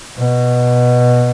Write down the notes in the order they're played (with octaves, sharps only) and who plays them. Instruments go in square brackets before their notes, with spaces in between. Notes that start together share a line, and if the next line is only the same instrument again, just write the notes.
[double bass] B2